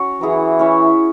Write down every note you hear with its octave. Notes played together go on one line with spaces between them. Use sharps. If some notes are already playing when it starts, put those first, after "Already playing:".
Already playing: C#4 F#4 C#5
E3 F#3 E4 G#4
C#4 E4 C#5 E5